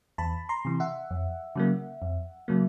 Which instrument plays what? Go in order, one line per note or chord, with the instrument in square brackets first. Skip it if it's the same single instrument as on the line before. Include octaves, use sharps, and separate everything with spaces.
[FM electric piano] E2 A5 B5
A#5 C6
C3 E3
E5 F#5
F2
C#3 F#3 A#3
F2
C#3 F#3 A#3